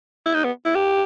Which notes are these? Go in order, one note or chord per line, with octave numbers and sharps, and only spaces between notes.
E4
D#4
B3
E4
G4